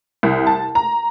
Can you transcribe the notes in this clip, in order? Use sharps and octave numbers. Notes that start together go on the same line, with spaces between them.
C2
A5
A#5